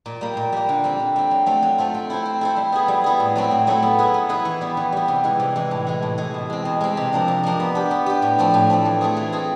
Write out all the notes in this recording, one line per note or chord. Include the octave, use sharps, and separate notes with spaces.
A#2
G3 A#3
A#2
G3 A#3
D3
G3 C4
D3
G3 C4
F#3
A3 C4 F4
F#3
A3 C4 F4
C4
E4 A4 C5
C4
E4 A4 C5
G3
B3 E4 G#4
G3
B3 E4 G#4
A2
F#3 A3 C4 E4
A2
F#3 A3 C4 E4
B3
E4 G#4 B4
B3
E4 G#4 B4
E3
G3 B3
E3
G3 B3
C3
E3 G#3
C3
E3 G#3
A2
E3 G#3
A2
E3 G#3
B2
G#3 C4
B2
G#3 C4
C3
F3 A#3 D4
C3
F3 A#3 D4
B3
D4 G4
B3
D4 G4
A2
F3 A3 C4
A2
F3 A3 C4
E3
A3 C4 F4 G#4
E3
A3 C4 F4 G#4